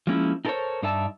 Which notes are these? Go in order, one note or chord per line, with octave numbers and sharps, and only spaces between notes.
F3 G#3 A#3 C#4 E4
D#4 E4 A4 A#4 C5 C#5
G2 D#4 D5 E5 A5